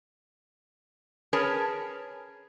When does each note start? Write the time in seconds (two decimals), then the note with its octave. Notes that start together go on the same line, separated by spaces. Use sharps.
1.33 C#4 G#4 A#4 B4 C#5 A5